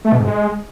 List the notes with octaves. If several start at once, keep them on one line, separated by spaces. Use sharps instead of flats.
A3
B2
G#2
G#3